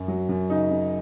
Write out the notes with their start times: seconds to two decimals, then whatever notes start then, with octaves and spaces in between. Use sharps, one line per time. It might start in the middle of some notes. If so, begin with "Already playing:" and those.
Already playing: F#2
0.08 F#3
0.29 F#2
0.49 C#3 D#4
0.70 C#3